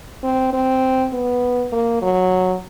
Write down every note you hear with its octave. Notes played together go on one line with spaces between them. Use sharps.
C4
C4
B3
A#3
F#3